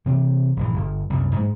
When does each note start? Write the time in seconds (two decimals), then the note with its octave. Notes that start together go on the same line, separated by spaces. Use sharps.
0.06 C3 E3 C4
0.57 A#1 G2 E3
0.74 G1
1.10 C2 F#2
1.35 G#2 G3 G#3